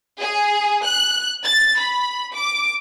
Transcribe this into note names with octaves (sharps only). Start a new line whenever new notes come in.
G#4
F#6
A6
B5
D6